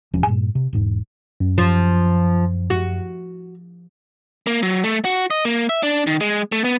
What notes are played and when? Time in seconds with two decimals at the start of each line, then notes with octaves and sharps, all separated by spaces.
0.14 E1 F3 C#4
0.27 G2 A#2
0.55 C3
0.73 E1 G#2
1.40 F#2
1.58 F3
2.70 F#4
4.47 A#3
4.63 F#3
4.84 A3
5.05 F#4
5.30 D#5
5.45 A#3
5.69 E5
5.83 D4
6.07 D#3
6.21 G#3
6.52 A3
6.64 B3